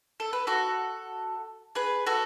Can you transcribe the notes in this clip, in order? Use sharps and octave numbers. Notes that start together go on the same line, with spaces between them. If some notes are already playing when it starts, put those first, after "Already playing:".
A4
B4
F#4 A4
G#4 B4
F#4 A4